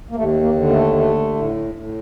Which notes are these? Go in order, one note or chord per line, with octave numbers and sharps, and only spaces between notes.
A#3
D#2 A3
A#3
D3
A3
A3
A2
A2